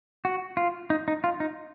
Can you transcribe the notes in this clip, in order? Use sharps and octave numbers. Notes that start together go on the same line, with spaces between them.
F#4
F4
D#4
D#4
F4
D#4